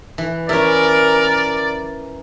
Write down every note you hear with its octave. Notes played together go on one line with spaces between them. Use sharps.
E3
C#4 E4 A#4 D5